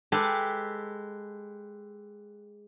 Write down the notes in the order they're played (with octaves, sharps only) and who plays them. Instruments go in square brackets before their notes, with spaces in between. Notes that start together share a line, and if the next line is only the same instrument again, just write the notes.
[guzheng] G#3 G4 A4 B4